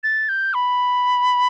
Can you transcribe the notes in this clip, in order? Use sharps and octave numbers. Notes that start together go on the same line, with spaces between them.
A6
G6
B5